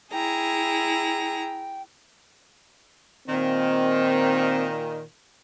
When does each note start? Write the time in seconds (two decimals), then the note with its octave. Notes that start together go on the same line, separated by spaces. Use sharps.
0.13 E4 G#4 G5 A#5
3.28 A#2 D#3 C4